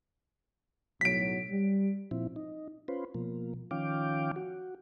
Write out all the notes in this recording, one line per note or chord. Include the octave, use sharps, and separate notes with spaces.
B1 A2 F#3 B6 D7
G3
A#2 F3 C4 E4
D#4
C#4 F4 B4 C5
B2 F3 A#3
D#3 F3 C#4 F5 G5 D6
F#4